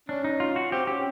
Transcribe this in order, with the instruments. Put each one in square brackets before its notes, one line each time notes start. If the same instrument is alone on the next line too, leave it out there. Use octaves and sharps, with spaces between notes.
[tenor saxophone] C#4 [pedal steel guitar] D4
[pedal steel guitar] D#4
F4
F#4
[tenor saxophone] C4 [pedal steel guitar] G4
[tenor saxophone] C#4 [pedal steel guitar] G4